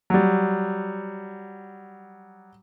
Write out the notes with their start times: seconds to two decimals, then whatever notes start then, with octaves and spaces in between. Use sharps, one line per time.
0.10 F#3 G3